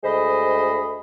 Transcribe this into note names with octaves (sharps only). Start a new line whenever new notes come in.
D2 G#3 C5 D#5 B5 D#6